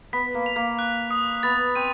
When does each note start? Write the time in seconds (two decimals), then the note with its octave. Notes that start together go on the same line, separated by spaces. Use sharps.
0.13 B3 B6
0.34 A#3
0.46 F7
0.56 A#3
0.79 F#6
1.11 D#6
1.43 B3 A6
1.75 C4 D#7